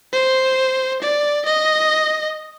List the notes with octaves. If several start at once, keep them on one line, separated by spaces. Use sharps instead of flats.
C5
D5
D#5